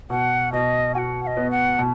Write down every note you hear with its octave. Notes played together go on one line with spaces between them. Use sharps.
B2 F#5
B2 D#5
F#4 F#5 G#5
F#5
D#5
B3
F#5
B2